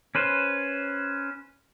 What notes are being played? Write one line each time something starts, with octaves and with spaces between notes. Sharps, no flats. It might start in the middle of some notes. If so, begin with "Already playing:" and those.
C#4 B4 C5